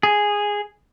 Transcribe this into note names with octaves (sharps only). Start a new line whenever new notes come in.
G#4